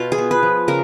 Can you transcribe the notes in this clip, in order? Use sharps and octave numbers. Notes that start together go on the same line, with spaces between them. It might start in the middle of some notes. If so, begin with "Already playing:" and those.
Already playing: B2 F4
G#4
B3
B4
F3
C#3 A#4